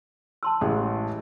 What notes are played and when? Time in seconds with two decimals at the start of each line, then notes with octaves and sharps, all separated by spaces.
0.43 A5 C6 E6
0.61 A1 G#3